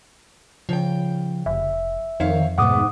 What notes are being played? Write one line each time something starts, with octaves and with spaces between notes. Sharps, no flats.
C#3 F3 G5
F1 E5
F2 D#3 C5 C#5 F5
G#2 B2 A3 B3 F#5 D6 D#6